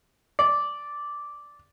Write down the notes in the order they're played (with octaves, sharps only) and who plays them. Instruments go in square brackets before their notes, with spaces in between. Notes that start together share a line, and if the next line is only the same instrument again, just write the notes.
[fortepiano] D5